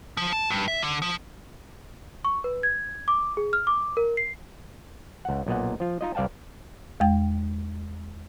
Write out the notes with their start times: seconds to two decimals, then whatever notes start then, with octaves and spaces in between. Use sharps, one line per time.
0.17 F3
0.33 A5
0.50 G2
0.68 E5
0.82 D3
1.02 F3
2.25 C#6
2.44 B4
2.63 G#6
3.08 D6
3.37 G#4
3.53 F6
3.67 D6
3.97 A#4
4.17 C7
5.25 C#2 F#5
5.46 B1 A#2 D#5 F#5
5.80 F3 F4
6.01 D#4 F4 D#5
6.15 C2 D5 F5 G5 A5
7.00 E2 G#3 G5